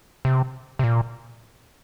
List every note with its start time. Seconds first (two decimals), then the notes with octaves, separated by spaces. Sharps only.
0.25 C3
0.79 C3
0.84 A#2